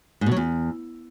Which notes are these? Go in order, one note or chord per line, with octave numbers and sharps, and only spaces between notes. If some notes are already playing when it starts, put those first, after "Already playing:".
G#2
B2
F#3
E2